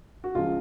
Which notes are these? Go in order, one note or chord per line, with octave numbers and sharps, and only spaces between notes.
F#4
C#2 C#3 F3 F4